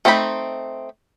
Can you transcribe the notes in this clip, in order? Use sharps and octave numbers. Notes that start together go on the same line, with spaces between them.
A3 C4 D#4 D5 B5